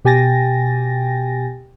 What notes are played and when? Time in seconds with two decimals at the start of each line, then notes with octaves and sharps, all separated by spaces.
0.05 B2 G4 G5 G#5 A6 A#6